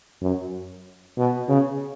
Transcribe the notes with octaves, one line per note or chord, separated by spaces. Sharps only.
F#2
B2
C#3